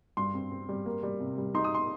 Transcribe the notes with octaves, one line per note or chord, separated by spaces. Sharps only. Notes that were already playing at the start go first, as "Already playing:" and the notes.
G2 C6
C4
C4
G3
A#3
G3
C3
G3
D#4 C6
D#6
C6